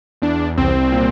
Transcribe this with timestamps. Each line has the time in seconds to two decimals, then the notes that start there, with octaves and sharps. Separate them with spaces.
0.22 E2 D4
0.57 C2 C4
0.92 A#2